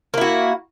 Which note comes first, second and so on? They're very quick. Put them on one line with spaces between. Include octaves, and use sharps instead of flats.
A#3 E4 F#4